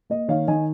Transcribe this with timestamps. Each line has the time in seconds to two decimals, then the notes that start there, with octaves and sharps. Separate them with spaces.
0.10 A#3 D#5
0.28 D#3 C#5 F5
0.47 D#3 D#5 G#5